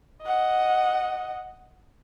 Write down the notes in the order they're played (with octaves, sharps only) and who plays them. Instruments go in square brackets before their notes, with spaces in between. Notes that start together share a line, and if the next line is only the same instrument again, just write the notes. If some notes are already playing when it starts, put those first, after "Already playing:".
[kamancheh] D#5 F#5